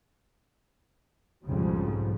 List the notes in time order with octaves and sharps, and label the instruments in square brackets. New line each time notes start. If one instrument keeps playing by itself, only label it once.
[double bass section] B1 F2 G#2 C#3 G3